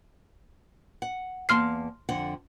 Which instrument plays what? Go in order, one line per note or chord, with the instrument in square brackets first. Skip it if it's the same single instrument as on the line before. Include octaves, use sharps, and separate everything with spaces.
[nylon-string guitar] F#5
[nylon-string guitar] E2 A#3 A5 [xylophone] C6 F6 C7
[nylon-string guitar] F2 D3 F#5